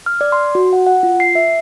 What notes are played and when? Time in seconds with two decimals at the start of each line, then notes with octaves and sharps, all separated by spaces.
0.06 F6
0.21 D5
0.32 C6
0.55 F#4
0.73 F#5
0.87 F#5
1.03 F4
1.20 C7
1.35 E5